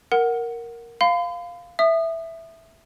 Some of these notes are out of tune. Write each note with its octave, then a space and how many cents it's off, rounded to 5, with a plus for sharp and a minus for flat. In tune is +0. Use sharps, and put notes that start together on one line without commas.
A#4 +0 F#5 +0
F5 +0 B5 +45
E5 +0 D#6 -25